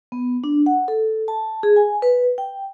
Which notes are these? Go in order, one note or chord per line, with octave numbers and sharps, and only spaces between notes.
B3
D4
F#5
A4
A5
G#4
G#5
B4
G5